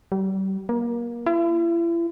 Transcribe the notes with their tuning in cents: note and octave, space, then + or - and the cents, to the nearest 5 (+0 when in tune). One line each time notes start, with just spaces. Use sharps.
G3 -35
A#3 +25
E4 +40